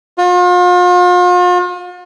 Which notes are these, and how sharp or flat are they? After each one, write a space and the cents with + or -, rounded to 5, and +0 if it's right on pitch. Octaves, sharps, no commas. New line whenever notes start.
F4 +40